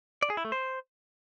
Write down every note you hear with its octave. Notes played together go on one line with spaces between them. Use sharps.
D5
G#4
E4
A3
C5